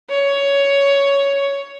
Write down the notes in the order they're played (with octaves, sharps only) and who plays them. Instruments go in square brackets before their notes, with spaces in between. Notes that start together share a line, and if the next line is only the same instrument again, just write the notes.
[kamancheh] C#5